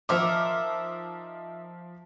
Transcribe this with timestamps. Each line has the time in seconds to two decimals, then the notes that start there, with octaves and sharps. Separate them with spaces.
0.09 F3 D#4 A#4 C5 E5 D6